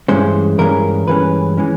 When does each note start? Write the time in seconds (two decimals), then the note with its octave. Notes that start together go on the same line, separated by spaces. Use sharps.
0.08 G2 E3 G#3 C#4 C5
0.58 G2 E3 G#3 C#4 A#4
1.07 G2 E3 G#3 C#4 B4
1.57 E3 G#3 C#4